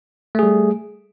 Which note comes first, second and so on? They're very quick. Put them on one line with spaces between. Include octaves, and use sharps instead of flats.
A3 G#4 G3